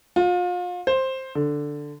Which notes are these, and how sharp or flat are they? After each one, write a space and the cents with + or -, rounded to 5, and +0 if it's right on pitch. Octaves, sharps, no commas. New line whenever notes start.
F4 +35
C5 +10
D3 +5